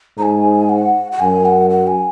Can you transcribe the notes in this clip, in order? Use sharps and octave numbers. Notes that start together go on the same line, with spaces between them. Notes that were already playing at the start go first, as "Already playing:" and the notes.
G#2 G#5 A#5
F#5
F#5
F#2 G#5
F#5
F#5
G#5